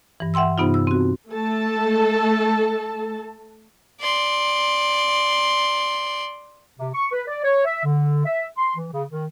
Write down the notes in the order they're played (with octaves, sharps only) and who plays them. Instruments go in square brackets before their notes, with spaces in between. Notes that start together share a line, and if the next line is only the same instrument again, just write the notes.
[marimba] G2 E3
E5 F#5 G5 C6 E6
G2 C3 B3 D#4 F4
E6
C4 F#4
[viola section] A3 A4 A5
[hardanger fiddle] D5 C6
[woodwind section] C3
C#6
B4
D5
C#5
E5
D3
E5
C6
E3
C#3
D#3